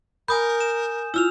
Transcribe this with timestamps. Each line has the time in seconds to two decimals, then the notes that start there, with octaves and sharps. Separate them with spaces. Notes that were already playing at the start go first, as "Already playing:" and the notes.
0.28 A#4 G#5 B5 D#6 G6
0.60 E7
1.14 E4 F4 E6 F6 F7